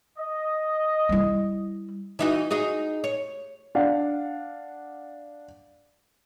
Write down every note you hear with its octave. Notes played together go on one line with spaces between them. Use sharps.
D#5
G3 E4
E3 D#4 F#4
D#4 F#4 G#4
C#5
D4 F5 F#5